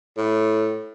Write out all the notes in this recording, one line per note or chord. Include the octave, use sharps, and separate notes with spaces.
A2